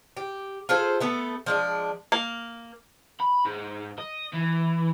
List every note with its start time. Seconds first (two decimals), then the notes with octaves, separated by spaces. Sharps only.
0.17 G4
0.69 F4 G#4 A4 C5
1.00 A3 B3 A4
1.46 F3 G#3 D4
2.12 A#3
3.20 B5
3.45 G#2
3.98 D#5
4.33 E3